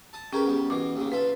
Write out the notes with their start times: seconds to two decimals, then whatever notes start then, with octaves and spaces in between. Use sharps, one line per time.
0.13 A5 D#6
0.33 C#4 G4 G#4 A#4 B4
0.47 G3 B3
0.70 B2 E3 D6
0.96 D#2 C#3
1.12 F4 A4 B4 E5